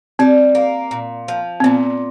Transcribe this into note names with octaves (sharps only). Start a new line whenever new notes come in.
G3 C4
A#3
A#2
F3
C4
A#2 B3